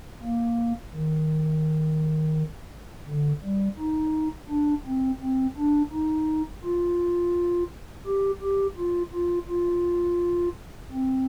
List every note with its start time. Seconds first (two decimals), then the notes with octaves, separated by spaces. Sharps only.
0.23 A#3
0.93 D#3
3.08 D3
3.44 G3
3.79 D#4
4.50 D4
4.86 C4
5.22 C4
5.58 D4
5.93 D#4
6.64 F4
8.06 G4
8.42 G4
8.78 F4
9.14 F4
9.49 F4
10.92 C4